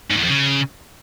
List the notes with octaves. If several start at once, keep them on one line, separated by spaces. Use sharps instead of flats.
G#2
E2
F2
C#3